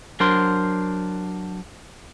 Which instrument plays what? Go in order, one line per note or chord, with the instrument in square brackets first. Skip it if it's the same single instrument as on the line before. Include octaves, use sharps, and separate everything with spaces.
[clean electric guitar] F#3 D4 A#4 C5 C6